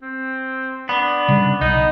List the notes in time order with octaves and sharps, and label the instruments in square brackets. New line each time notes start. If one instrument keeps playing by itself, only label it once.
[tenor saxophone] C4
[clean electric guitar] B3 [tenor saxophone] D4
[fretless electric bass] C#3 G3
[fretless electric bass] B1 [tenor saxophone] D#4